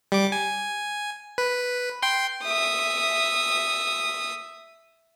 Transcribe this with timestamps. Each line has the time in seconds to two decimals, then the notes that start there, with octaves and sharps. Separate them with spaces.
0.12 G3 D6
0.32 G#5
1.38 B4
2.02 G5 C6
2.44 E5 D#6